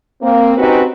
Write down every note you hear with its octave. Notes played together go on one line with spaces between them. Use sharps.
A#3 C4
C4 C#4 D#4 F#4 G4 B4